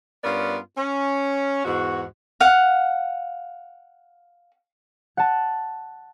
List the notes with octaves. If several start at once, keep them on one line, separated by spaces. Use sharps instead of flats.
G2 B3 C#4 F4 A#4 D5
C#4
E2 G#2 F#4
F5 F#5
F#5 A5